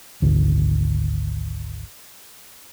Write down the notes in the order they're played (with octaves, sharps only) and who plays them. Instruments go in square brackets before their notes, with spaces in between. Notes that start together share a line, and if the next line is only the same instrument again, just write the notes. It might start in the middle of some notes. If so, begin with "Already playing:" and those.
[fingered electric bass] G#1 D2